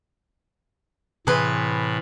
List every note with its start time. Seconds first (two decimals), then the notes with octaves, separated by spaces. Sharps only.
1.27 A2 C3 E3 G#4 B4 C6